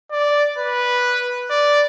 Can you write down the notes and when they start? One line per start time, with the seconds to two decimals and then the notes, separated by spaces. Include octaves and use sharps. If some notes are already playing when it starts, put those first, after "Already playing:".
0.12 D5
0.58 B4
1.51 D5